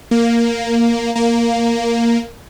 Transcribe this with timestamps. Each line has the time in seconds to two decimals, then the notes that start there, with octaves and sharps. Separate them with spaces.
0.11 A#3
1.15 A#3